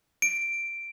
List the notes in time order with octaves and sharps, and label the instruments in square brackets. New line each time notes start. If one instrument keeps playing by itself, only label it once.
[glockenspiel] D7